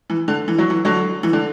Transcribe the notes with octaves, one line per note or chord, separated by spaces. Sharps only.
E3
D3
E3
F#3
E3
D3 F#3
E3
D3